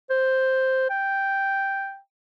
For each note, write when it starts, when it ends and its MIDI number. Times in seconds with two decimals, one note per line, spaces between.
0.10 0.88 72
0.90 1.98 79